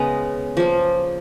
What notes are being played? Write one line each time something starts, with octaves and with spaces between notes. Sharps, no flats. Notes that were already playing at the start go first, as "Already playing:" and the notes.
Already playing: C#3 G#3 B3 D#5 A#5
F3 A#3